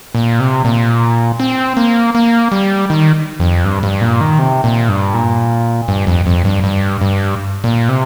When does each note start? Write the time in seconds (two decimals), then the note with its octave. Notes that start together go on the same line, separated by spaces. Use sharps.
0.15 A#2
0.40 C3
0.65 A#2
1.40 C4
1.77 A#3
2.15 A#3
2.52 G3
2.90 D#3
3.40 F2
3.65 G2
3.83 G2
4.01 A#2
4.21 D#3
4.39 C3
4.64 A#2
4.89 G2
5.14 A#2
5.88 G2
6.07 F2
6.26 F2
6.45 G2
6.64 G2
7.01 G2
7.64 A#2
7.89 C3